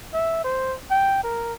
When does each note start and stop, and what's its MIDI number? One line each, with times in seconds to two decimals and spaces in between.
0.14 0.41 76
0.44 0.75 72
0.91 1.20 79
1.24 1.53 70